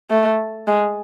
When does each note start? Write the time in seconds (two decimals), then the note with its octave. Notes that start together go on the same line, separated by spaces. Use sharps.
0.10 A3
0.67 G#3